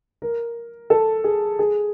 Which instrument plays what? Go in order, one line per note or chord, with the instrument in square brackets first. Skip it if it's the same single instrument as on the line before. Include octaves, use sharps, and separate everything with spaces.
[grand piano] A#4
A4
G#4
G#4